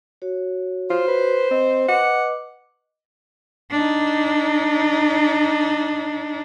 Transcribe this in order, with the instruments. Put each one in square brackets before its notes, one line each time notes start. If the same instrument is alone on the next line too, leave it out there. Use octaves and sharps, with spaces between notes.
[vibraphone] F#4 C#5
[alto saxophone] F4 [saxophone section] C5
[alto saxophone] B4
[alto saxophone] C4 [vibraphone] D#5
[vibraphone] B4 D#5 D6 [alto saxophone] F#5
[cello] D4 D#4